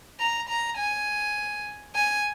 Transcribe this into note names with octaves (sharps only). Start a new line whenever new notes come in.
A#5
A#5
G#5
G#5